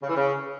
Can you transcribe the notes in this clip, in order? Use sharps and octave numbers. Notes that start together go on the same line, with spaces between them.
C#3
E3
C#3